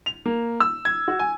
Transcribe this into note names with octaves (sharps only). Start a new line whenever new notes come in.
F7
A#3
E6
G#6
F#4
G#5